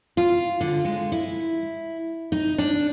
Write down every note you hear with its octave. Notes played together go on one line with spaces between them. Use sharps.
F4
D3
G#3
E4
D#4
D4